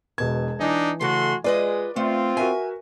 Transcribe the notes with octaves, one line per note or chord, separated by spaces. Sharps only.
E1 B2 A5 G#6
E3 D4 D#4
C#3 A3 F#4 A4 C6
G#3 F4 B4 D5 D#5
A3 C4 F4
F#4 A#4 E5 G#5